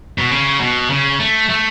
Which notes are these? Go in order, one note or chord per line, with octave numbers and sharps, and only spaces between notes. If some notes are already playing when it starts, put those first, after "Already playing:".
B2
C#3
B2
C#3
A3
A3